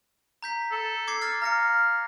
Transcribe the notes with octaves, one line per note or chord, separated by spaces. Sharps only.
A#5 G6 B6
A4
D6 G#6 C7
D6 F6 A6
F5 A#5 A#6 C#7